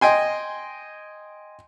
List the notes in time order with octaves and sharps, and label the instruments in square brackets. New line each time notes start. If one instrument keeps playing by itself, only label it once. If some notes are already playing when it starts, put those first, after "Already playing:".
[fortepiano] D#5 G5 G#5 C6